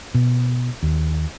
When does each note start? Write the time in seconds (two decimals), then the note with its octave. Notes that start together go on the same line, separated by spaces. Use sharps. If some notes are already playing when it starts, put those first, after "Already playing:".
0.15 B2
0.83 D#2